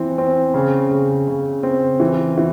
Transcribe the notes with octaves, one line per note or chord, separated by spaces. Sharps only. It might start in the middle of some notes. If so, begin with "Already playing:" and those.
Already playing: E3 C4
C4
C#3
C#3
C#3
C4
E3
E3